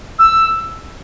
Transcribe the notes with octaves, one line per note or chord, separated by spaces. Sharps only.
E6